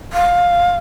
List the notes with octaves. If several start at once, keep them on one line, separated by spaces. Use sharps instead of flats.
F5